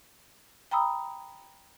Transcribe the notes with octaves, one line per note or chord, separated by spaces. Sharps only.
G5 A#5 B5 D#6 E6